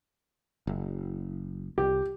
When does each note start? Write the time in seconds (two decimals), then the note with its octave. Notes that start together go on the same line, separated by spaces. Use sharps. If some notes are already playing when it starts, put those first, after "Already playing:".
0.67 F#1
1.78 C2 G4